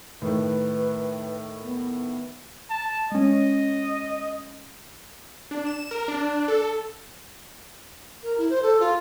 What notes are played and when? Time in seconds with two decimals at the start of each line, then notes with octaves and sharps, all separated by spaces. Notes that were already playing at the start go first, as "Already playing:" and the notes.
0.22 A2 D#3 B4
1.62 B3
2.70 A5
3.12 G#3 C#4 D#5
5.51 D4
5.67 E7
5.91 A#4
6.08 D4
6.48 A4
8.22 A#4
8.37 E4
8.49 C5
8.62 A4
8.80 F4